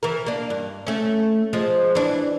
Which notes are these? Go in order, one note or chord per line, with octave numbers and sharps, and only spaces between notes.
E3 A#4
A#3 D4
G2
A3 C#4
F3 G#3
E3 D4